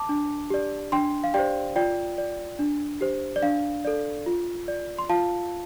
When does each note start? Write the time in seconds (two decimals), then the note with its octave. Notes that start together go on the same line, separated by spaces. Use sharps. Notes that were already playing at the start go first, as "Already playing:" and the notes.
Already playing: A5 D6
0.09 D4
0.50 G4 D5
0.92 D4 G5 C6
1.24 F5
1.34 G4 C5 D5 G5
1.76 F4 D5 G5
2.18 D5
2.59 D4
3.01 G4 C5
3.36 D5
3.42 D4 F5
3.85 A4 D5
4.26 F4
4.68 D5
4.98 C6
5.09 F4 F5 A5